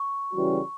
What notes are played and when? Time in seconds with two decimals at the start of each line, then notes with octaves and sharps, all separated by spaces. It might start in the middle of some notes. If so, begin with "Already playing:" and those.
Already playing: C#6
0.33 C#3 E3 G3 C#4 F#4